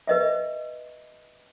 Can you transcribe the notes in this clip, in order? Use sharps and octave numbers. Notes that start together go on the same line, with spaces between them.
B4 D#5 E5